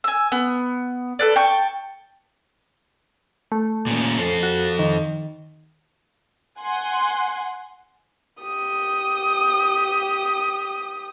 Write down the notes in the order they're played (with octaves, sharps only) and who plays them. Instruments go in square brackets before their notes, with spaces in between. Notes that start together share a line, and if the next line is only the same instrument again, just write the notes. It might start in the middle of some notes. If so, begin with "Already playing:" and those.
[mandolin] G#5 E6
B3
A4 B4 D5
G5 A5 C#6
[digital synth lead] A3
[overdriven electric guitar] A#2 C#4
[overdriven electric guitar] F2 A4 [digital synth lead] C7
[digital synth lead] F#4
D#3
[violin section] F#5 G#5 C6
[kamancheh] G4 D#6